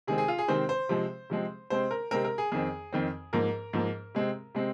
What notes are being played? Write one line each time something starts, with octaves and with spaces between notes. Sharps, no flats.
C3 D#3 G#3 C4 G#4
G#4
F4
G#4
C3 D#3 G#3 C4 C5
C5
C3 F3 G#3 C4
C3 F3 G#3 C4
C3 G#3 C4 C5
A#4
C3 G#3 C4 A#4
A#4
G#4
F2 D#3 C4 G#4
F2 D#3 C4
G#2 F3 A#3 A#4
G#2 F3 A#3
C3 G#3 C4
C3 G#3 C4